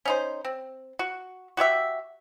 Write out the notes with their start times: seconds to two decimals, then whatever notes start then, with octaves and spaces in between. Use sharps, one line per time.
0.05 C#4 D#4 C5
0.45 C4
0.99 F#4
1.57 F#4 G4 C#5 E5